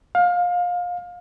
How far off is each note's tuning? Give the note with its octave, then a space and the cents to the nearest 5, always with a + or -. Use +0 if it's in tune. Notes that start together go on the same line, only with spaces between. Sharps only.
F5 +25